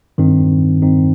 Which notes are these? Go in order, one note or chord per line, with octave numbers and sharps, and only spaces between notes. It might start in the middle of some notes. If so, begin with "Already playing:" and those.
G2 D#3 C4 D#4
G2 D#3 C4 D#4